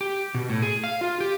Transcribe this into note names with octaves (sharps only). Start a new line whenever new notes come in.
G4
B2
A2
G#4
F5
F4
G4